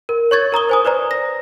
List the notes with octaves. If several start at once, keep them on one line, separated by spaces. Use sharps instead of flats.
A#4
C#5 C#6 G#6 A6
A#4 A#5 D#6 G7
C5 G#5 D#6
B4 C5 D5 A#5
A#6